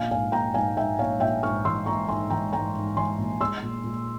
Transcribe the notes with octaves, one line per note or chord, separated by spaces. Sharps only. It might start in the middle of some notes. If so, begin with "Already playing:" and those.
Already playing: A#1 F5 G#5
G#2 F5 G#5
A#1 G5 A#5
G#2 F5 G#5
G#2 E5 G5
A#1 C#5 F5
A#1 E5 G5
G#2 C#6 F6
E3 C6 E6
A#1 A#5 C#6
G#2 G#5 C6
E3 G5 A#5
G#2 G5 A#5
G#2
E3 G#5 C6
A#1
G#3 C6 E6
A#2
A#2